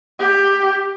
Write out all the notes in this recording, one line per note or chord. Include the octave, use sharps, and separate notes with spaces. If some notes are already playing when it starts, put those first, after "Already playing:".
G4